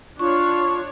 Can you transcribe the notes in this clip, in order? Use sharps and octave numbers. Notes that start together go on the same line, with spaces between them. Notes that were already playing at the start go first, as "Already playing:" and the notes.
D4 F4 C#5 C#6